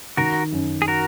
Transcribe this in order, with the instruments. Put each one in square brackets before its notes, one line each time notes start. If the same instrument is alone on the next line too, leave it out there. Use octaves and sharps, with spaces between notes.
[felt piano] D#3 [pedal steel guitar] F#4 A#4
[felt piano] F#2
[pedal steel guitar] G#4
F#4 A#4